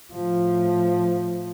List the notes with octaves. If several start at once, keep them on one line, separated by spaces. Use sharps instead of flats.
A2 F3